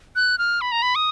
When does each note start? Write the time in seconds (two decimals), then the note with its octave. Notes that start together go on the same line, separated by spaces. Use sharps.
0.16 F#6
0.38 F6
0.61 B5
0.72 A#5
0.82 B5
0.95 D#6